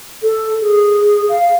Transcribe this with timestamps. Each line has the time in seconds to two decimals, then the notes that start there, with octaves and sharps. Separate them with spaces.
0.23 A4
0.62 G#4
1.29 F5